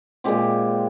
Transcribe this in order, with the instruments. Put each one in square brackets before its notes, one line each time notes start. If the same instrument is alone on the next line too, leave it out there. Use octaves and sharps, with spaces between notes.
[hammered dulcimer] A#2 G#3 C4 G4